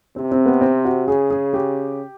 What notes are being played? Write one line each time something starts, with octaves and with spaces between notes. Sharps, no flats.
C3 C4
C4
B3
C4
F#4
C#3 G#4
G#4
G4